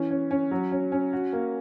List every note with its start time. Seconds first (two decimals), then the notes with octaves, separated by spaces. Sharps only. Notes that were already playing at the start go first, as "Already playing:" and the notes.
Already playing: E3 C#4
0.11 C#4
0.31 C#4
0.51 F#3
0.72 C#4
0.92 C#4
1.13 F#4
1.33 A#3